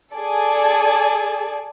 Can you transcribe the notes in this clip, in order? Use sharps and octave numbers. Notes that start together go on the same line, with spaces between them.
G#4 A4 D5 G#5